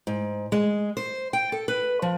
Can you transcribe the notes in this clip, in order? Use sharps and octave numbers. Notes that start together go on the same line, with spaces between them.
G#2
G#3
C5
G5
A4
B4
F3